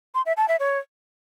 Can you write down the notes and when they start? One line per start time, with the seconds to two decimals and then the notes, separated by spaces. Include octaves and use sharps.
0.15 C6
0.26 E5
0.37 A5
0.48 E5
0.59 C#5